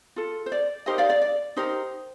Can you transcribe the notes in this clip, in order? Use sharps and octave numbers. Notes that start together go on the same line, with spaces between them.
F4 A4
C5
D5
D#4 G4 A#4 C5 D#5
D5 F5
D5
D5
D#4 G4 A#4 C5